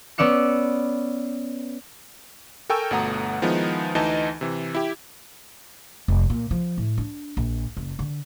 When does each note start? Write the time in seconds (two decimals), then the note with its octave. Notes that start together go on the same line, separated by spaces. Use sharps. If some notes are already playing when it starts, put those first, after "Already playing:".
0.18 B3 C#4 D5 E6 C#7
2.70 A4 A#4 G5 G#5 C#6 E6
2.91 G1 B2 A3 F#5 A#5 D#6
3.42 D#3 F3 G#3 B3 D#4 E4
3.95 D2 E3 D#4 B4 D#5 A5
4.41 C3 E3
4.75 E4 G4
6.08 F1
6.30 A#2
6.51 F3
6.77 A2
6.98 D4
7.37 A#1
7.77 F#1
7.99 D3